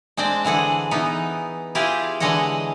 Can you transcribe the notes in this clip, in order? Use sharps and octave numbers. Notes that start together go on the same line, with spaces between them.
G#3 C4 D4 C5 D5
D3 E3 G#4 F#5
E3 B3 D#4
E4 F4 G4 G#4
D3 E3 G#3 C#5 D#5 F#5